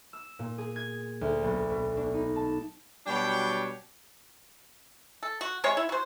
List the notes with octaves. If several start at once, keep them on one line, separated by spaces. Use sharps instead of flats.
E6
A#2
G#4
G#6
D2
B1
B2
D4
D#4
A5
B2 F#3 G3 D4 C#5 G5
A4
F#4
C3 G#3 C#5
E4
F#4 C5